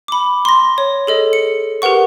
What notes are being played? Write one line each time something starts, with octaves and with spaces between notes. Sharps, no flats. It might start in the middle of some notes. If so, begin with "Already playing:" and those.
B5 D6
C6 A#6
C#5
G#4 A4 D#5
C#7
G4 A#4 B4 F#5 C#6